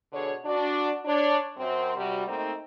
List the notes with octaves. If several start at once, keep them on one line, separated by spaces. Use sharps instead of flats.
B2 D3 G#4 C#5
D4 F#4
D4 C#5
F#2 C4
C3 G3 F#4
A3 A#3 C4 D#4